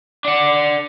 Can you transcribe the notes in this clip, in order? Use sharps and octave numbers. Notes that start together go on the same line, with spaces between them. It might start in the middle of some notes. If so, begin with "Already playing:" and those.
D4 F#5